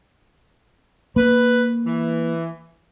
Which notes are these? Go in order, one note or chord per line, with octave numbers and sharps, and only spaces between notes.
A#3 B4
E3